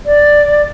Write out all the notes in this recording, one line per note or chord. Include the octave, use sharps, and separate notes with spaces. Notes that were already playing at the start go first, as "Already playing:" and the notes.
D5